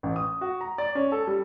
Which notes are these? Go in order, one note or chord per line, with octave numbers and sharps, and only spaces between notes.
A1
D#6
F#4
A#5
D5
C#4
A4
G3